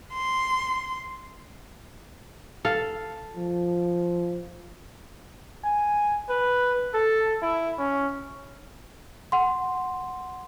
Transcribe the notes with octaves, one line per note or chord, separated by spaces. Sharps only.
C6
A4 F5
F3
G#5
B4
A4
E4
C#4
F#5 C6